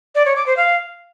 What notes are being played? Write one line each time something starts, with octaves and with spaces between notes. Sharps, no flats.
D5
C#5
D6
C5
F5